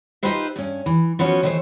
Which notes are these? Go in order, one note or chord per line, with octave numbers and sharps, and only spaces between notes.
D#4 F4 G4 B4 C5 E5
G2 C#4
E3
F3 B3 C#4 E4 F#4 C#5
D#3 E3 A3 A#4 C5 C#5